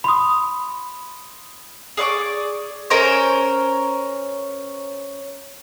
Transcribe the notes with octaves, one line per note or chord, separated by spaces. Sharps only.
B5 C6 D#6
G#4 D5 C#6 D6
C#4 A#4 C5 C#5